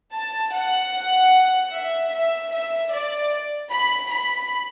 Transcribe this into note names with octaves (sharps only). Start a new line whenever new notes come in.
A5
F#5
E5
E5
E5
D5
B5
B5